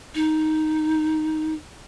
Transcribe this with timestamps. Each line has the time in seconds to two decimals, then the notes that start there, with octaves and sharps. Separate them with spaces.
0.15 D#4